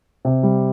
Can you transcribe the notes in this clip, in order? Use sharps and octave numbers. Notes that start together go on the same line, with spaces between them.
C3
G3